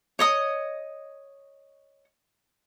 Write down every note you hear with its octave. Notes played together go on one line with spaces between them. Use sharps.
C#5 D#5 D#6